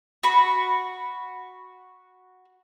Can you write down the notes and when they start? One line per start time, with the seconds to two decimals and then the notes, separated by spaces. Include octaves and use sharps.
0.23 F#4 B5